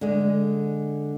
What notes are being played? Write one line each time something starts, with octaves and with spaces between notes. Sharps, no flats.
D3 G#3